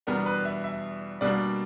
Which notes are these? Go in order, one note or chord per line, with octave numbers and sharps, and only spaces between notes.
E2 B2 G3 B3 D4 A#4
B4
E5
E5
B2 G3 A#3 D4 D5